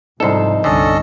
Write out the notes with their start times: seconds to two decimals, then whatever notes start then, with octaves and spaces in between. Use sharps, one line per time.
0.20 C2 G#2 F3 D#4 A4 C6
0.64 G1 C2 D3 C#4 A4 D#5